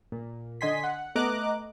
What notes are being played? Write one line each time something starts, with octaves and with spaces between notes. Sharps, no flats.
A#2
D3 D#5 G#5 C6 B6
F#5
A3 B3 D#5 A#5 D6 F#6